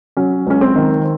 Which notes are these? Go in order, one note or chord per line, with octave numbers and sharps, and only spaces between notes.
F#3 C#4
C#2 C#4
C4
D#3